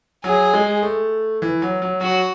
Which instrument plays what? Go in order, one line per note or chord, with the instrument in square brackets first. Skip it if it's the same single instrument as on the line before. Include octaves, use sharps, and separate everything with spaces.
[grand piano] F#3 [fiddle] G#4
[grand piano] G#3
A3
E3
F#3
F#3
[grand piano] F#3 [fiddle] F#4